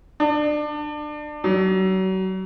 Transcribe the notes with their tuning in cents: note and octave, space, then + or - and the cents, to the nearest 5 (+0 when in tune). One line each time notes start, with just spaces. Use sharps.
D4 +25
F#3 +35